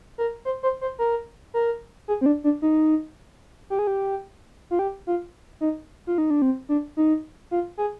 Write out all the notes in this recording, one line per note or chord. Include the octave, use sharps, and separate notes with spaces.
A#4
C5
C5
C5
A#4
A#4
G#4
C4
D4
D4
D#4
G4
G#4
G4
F4
G4
F4
D#4
F4
D#4
D4
C4
D4
D#4
F4
G#4